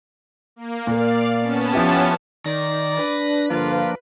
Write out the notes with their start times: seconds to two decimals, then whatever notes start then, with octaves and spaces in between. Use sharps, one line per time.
0.56 A#3
0.87 A#2 A#3 D5 F5
1.40 B3 C#4 A5
1.73 F3 E4 G4
2.46 D#3 D5 A#6
2.99 D4 B4
3.50 G2 D3 F3 A#3 D4 F4